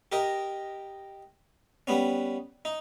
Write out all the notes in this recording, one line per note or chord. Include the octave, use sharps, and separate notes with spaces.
G4 A#4 D#5
G3 B3 C#4
D#4